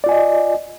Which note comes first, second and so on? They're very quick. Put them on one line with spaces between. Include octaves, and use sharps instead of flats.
D5 F4 G#5 D#5